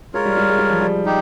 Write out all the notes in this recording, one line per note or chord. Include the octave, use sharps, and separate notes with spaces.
G#3 F4 A#4 C#5
G3
G3
G#3
G3
F3
G3
D#4 G4